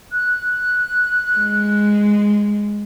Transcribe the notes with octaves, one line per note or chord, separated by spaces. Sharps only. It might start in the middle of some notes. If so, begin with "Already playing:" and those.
F#6
G#3